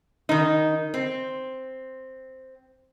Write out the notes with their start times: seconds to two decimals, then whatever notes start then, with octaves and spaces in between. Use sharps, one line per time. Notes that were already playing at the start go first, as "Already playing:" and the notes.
0.29 D#3 D#4
0.94 C4